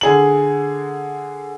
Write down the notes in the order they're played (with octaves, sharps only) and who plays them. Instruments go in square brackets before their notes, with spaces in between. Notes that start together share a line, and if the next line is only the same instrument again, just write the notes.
[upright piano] D3 G#4 F#7